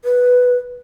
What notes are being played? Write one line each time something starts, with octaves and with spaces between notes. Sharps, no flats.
B4